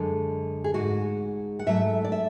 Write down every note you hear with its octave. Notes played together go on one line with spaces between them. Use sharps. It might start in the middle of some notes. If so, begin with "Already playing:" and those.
Already playing: F#2 D3 G#3
G#4
G#2 G#3 F#4
F#5
G#2 F#3 A3 E5
D5
E5